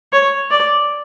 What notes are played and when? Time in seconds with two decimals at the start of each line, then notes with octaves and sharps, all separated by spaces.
0.13 C#5
0.51 D5